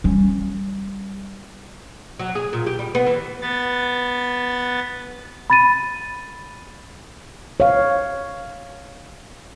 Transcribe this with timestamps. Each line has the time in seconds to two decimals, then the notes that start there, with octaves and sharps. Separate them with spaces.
0.04 G3 C#4
2.19 F#3
2.35 G#4
2.53 A#2
2.67 G4
2.79 G3
2.95 B3
3.06 E3
3.42 B3 A6
5.50 B5 A6 D#7
7.60 C#5 F5